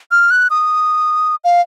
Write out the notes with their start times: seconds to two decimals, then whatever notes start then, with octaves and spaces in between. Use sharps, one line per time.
0.11 F6
0.31 F#6
0.50 D#6
1.44 F5